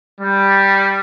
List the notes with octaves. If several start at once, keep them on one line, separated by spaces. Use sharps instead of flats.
G3